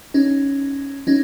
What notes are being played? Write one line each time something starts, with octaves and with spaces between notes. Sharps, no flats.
C#4 D#4
C#4 D#4